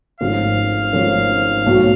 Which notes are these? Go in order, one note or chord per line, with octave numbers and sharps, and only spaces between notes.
G#1 G#2 F3 A3 C#4 F5
G#1 G#2 F3 A3 C#4
B1 A2 F#3 A3